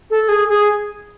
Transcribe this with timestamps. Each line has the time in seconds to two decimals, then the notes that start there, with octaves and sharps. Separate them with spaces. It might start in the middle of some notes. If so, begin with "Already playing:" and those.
0.10 A4
0.29 G#4
0.48 G#4